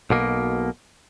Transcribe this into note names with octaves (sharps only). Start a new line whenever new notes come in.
B1 B2 A#3